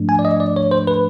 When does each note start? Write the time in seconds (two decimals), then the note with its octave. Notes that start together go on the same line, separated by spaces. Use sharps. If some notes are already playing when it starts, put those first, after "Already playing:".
Already playing: G#2 F3 A3 D4
0.09 G#5
0.19 D5
0.25 D#5
0.40 D5
0.56 C#5
0.71 C5
0.87 B4